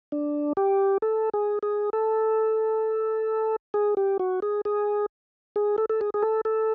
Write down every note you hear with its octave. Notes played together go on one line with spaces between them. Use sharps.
D4
G4
A4
G#4
G#4
A4
G#4
G4
F#4
G#4
G#4
G#4
A4
A4
G#4
G#4
A4
A4